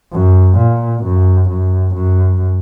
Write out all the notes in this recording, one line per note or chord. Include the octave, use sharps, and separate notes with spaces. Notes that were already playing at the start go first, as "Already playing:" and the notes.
F#2
A#2
F#2
F#2
F#2